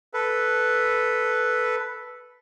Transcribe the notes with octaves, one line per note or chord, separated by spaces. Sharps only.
A4 B4